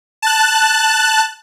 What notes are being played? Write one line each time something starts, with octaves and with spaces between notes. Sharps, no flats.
A5 F#6